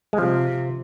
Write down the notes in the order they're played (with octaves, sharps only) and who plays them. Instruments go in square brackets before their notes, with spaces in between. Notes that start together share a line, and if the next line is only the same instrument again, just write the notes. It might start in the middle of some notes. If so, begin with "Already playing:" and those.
[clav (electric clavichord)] G#3
[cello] C3 [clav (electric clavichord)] F3